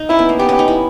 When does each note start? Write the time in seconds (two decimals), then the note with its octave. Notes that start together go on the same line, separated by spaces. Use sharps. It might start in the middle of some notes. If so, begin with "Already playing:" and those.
Already playing: D#4
0.09 C#4 E4
0.19 B3
0.29 A#3
0.39 B3 G4
0.49 C#4
0.59 D#4
0.68 E4